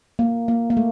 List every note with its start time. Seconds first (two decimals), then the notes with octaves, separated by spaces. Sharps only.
0.19 A#3
0.48 A#3
0.70 A#3
0.77 A3